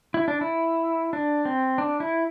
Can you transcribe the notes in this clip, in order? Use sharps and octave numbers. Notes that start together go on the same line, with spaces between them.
E4
D4
E4
D4
C4
D4
E4